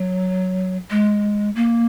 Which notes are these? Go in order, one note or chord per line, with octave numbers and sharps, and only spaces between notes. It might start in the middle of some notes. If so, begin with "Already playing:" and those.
Already playing: F#3
G#3
A#3